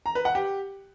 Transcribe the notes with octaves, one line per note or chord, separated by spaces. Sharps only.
A#5
B4
F#5
G4